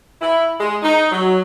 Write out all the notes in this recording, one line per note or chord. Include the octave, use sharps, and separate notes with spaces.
E4
G#3
D#4
F#3